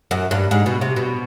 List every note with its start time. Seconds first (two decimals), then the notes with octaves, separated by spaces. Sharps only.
0.11 F#2
0.31 G2
0.51 G#2
0.66 B2
0.81 C3
0.96 B2